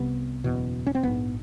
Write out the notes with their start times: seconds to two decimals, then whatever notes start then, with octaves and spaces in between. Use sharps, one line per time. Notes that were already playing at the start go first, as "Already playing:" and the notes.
Already playing: C2 C3 B3
0.44 F#1 E2 B2
0.87 C#4
0.95 C4
1.03 A#1 G#2 B3